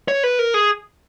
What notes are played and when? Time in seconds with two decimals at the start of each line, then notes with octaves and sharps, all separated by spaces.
0.08 C#5
0.23 B4
0.39 A#4
0.54 G#4